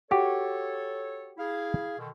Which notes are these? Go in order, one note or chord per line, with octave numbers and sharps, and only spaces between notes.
F#4 G4 A4 C#5
E4 G#4 F5
B2 D3 D#3